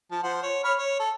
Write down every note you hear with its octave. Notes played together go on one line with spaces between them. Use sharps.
F3 A5
F3 C5 F#5
C#5
C#5 B5 F6
C#5
A4